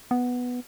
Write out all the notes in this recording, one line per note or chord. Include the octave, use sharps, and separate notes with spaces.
B3